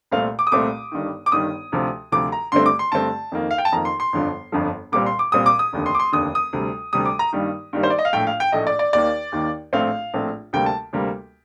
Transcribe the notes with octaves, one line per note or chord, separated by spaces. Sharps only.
C2 A#2 A3 C4 F5
D6
D#6
C2 A#2 A3 C4 D6
G1 G2 D#3
D6
G1 G2 D#3 D#6
D2 C3 F3
D2 C3 F3 D6
A#5
G2 D3 A3 C4 C6
D6
C6
G2 D3 A3 C4 A5
F2 D#3 A#3
F5
G5
A5
F2 D#3 A#3 A#5
C6
C6
G1 F2 D3 F3
G1 F2 D3 F3
C2 A#2 G3 C4 D6
C6
D6
C2 A#2 G3 C4 D#6
D6
D#6
F1 D#2 D3
C6
D6
C6
F1 D#2 D3 D#6
D#6
D2 C3 G3
D2 C3 G3 D#6
D6
A#5
G2 D#3 G3 A#3
G2 D#3 G3 A#3
C5
D5
D#5
F5
A#1 A2 A3 G5
F5
G5
A#1 A2 A3 D#5
D5
D5
D#2 D#3 A#3 D5
D#2 D#3 A#3
A#1 A2 A3 C4 F5
A#1 A2 A3 C4
D2 C3 G3 A#3 G5
A5
D2 C3 G3 A#3